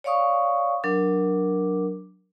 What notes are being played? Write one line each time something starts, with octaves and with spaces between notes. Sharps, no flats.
C#5 D5 F5 C#6 D#6
F#3 D4 A#4 D6